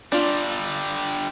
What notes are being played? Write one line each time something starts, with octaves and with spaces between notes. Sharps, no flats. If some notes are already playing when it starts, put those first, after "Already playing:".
D3 G3 D4 F4